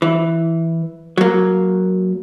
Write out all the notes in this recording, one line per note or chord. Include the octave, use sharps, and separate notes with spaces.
E3
F#3 A#3